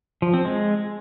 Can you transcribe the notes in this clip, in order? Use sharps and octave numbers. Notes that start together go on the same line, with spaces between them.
F3
C4
G#3